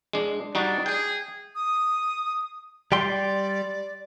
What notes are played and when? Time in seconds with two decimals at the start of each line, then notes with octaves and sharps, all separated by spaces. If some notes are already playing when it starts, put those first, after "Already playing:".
0.13 G#3 D4
0.55 G3 D4 D#4 F#4
0.86 G#4 G5
1.56 D#6
2.92 G3 D5 G5 C6